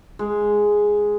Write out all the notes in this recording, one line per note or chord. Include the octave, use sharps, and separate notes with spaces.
G#3